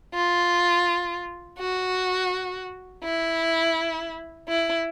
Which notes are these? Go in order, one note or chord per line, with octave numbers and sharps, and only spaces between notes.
F4
F#4
E4
E4